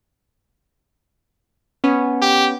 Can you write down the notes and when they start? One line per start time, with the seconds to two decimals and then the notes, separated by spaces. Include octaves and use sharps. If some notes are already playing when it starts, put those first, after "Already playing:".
1.84 B3 C#4
2.22 G4